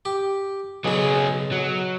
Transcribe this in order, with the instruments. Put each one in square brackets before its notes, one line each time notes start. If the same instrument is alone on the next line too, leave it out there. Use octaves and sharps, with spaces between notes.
[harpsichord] G4
[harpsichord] B1 C#3 [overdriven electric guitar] F#3 G#4
[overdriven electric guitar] F#3